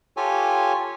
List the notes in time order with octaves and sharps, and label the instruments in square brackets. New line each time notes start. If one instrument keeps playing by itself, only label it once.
[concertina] F4 G4 A4 C#5 G#5